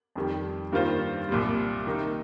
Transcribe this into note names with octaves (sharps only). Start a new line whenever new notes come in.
F2 D#3 G3
G2 D#3 A#3 F4 C5
C2 A#2 G3
C3 D#3 A#3 D#4